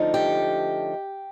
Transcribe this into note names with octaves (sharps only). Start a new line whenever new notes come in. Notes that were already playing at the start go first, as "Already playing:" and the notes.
Already playing: D3 F3 A3 D#4
G4